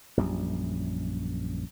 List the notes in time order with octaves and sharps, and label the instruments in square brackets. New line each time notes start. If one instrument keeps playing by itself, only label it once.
[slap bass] A#1 F#2 G3